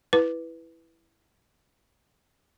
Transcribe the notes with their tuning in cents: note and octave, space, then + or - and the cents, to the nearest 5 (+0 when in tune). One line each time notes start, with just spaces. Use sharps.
E4 +0 B4 +0